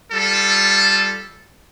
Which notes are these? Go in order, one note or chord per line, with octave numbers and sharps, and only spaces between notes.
G3 F4 A4